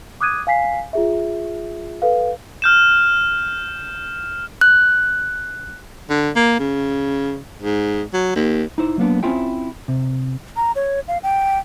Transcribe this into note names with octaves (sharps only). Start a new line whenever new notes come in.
D6 D#6 F#6 G#6 D#7
F5 G#5 B6 C7
F4 G#4 E5
A4 B4 F5
F6 G6 E7
F#6
D3
A#3
C#3
G#2
F#3
D#2
D#4 E4 C5
F#3 A#3 B3 D4
C4 C#4 E4 F4 E5 G5
C3
A#5
C#5
F5
G5